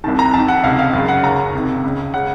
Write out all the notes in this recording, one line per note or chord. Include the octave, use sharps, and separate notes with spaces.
C2 C3 D#3 A5
A#5
F2 D#3 A5
F#5
C#2 C3 D#3 F5
F5
F#2 C#3 F5
F#5
D#2 C#3 A#5
C#2 C3 D#3
C#2 C#3
C#3 F#5